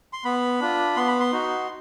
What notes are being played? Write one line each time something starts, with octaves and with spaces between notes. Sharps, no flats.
C6
B3 B5
D4 F4
B3 C6
B5
C6
D#4 F#4